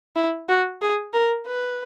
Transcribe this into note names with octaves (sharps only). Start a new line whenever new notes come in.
E4
F#4
G#4
A#4
B4